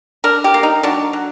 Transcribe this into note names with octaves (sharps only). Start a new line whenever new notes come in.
D4 A#4
G4
A#3
D#4
F#3 D4
F#3